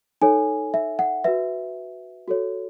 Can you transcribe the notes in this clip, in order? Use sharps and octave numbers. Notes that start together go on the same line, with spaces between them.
D#4 A4 C#5 G#5
E5
F#5
F#4 B4 E5
F#4 A4 C#5